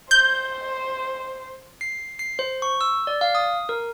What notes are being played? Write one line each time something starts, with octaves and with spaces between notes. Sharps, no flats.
C5 G6
C7
C7
C5
C#6
E6
D5
F5
D#6
A#4